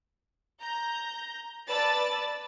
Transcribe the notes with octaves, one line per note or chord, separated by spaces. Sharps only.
A#5 G6
B4 D5 A5 E6 A6